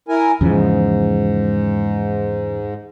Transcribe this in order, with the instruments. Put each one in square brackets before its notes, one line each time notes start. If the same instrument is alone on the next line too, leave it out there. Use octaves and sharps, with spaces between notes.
[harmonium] E4 A#4 G#5
[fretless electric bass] E2 C#3 F3 [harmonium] G#2